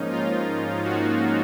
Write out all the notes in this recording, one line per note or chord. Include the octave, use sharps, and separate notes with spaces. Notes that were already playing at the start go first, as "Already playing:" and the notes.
Already playing: G#2 F3 A#3 C#4 D#4
F4
F#4